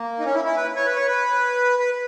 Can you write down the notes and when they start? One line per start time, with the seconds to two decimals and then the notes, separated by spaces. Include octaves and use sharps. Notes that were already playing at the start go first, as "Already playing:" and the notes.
Already playing: A#3
0.19 D#4
0.25 C#4
0.35 E4
0.45 E4
0.56 B4
0.76 C#5
0.86 B4
0.96 C#5
1.07 B4
1.79 B4